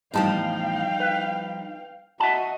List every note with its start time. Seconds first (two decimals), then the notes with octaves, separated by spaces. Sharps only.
0.14 E2 A2 F3 G3 D#4 F5 G5 A5
1.00 B4
2.20 F#4 D#5 E5 A5